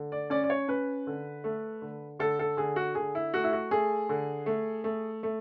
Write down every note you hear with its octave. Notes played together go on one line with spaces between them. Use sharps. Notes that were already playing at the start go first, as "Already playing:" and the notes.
Already playing: D3
D5
C#4 D5
D5
C#5
C#4 B4
D3
A3
D3
D3 A4
A4
D3 G#4
F#4
D3 G#4
E4
A3 F#4
E4
F#4
A3 G#4
D3
A3
A3
A3